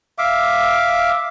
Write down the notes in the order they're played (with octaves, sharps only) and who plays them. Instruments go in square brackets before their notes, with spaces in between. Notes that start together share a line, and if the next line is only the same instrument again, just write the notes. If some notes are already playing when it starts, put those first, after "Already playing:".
[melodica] E5 F5 D6